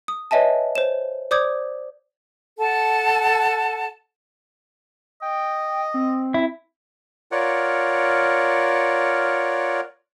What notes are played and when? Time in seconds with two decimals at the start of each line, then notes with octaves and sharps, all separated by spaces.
0.08 D#6
0.31 B4 C#5 D#5 E5 G#5 A5
0.75 C5 C#5 E7
1.31 C5 D5 D6 D#6 G6 G#6
2.58 A4 F#5 A5
5.22 D#5 G5
5.94 C4
6.34 E4
7.32 F4 A#4 C#5 D5 F#5